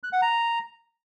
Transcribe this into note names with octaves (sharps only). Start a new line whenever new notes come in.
F#6
F#5
A#5